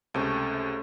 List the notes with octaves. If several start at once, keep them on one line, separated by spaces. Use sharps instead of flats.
C#2 C3 A3 C#4